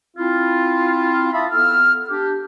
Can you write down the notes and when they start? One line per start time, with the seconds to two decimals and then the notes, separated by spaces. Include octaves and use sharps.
0.17 C4 E4 F4
1.33 E5 F5 A5 B5 D#6
1.52 B3 A4 E6 F6
2.09 D4 G4